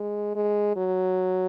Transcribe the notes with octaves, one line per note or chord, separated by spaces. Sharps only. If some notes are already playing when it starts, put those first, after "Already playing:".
Already playing: G#3
G#3
F#3